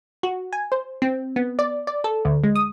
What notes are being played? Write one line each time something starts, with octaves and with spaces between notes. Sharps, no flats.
F#4
G#5
C5
C4
B3
D5
D5
A4
D2
G#3
D#6